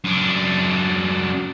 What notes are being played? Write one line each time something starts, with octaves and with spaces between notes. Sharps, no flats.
F#2 D4